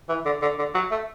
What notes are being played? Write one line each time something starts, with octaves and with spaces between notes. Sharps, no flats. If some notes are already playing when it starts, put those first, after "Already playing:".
E3
D3
D3
D3
F#3
A3